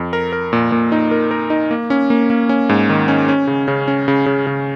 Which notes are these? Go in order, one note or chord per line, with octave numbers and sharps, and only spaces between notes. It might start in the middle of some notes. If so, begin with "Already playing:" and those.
Already playing: F2
A#4
A#4
A#2
A#2
D#4
A#4
A#4
D#4
A#3
C#4
A#3
A#3
C#4
G#2
D#3
C#4
C#4
C#3
C#3
C#4
C#3
C#3
C#3